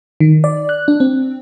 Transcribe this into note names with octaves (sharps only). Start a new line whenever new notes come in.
D#3
D5
F#6
D4
C4